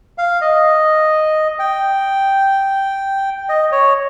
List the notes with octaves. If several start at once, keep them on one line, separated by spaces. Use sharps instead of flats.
F5
D#5
G5
D#5
C#5